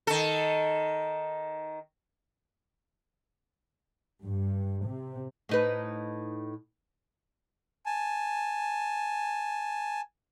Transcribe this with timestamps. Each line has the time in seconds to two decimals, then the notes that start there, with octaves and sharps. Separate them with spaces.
0.07 D#3 A4
4.24 G2
4.86 C3
5.49 A2 D#4 B4
7.86 G#5 A5